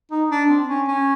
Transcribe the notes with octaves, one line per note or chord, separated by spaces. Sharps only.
D#4
D4
C4
C#4
C#4